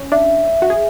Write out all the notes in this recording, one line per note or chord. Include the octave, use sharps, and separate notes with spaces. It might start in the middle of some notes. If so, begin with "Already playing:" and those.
Already playing: C#4
D4 E5
F#4
G#4